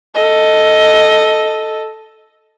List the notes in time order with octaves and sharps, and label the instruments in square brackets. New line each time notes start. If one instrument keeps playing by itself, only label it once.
[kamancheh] A4 D#5